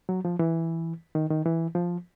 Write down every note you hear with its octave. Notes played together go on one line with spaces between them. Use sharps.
F#3
F3
E3
D#3
D#3
E3
F3